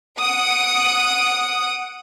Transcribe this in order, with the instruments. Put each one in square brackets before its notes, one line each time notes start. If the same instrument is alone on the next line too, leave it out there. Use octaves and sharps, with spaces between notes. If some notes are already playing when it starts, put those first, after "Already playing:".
[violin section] F#5 D#6 D7